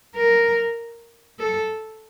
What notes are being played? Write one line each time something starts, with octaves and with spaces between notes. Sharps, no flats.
A#4
A4